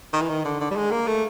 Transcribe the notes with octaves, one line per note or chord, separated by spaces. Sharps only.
D#3
E3
D#3
D3
D3
G3
G#3
A#3
A3